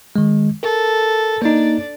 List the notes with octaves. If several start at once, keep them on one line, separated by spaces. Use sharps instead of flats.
D#3 G#3
A4 A#4
A#3 D4 D#4 D5